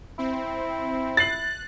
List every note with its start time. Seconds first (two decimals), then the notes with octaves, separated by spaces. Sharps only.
0.19 C4 E4
1.17 F#6 A6 C7 F#7